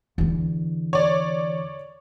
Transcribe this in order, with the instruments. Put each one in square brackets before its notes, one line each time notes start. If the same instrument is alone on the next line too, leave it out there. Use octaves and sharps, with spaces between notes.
[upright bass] E2 D3
[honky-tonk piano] C#5 D5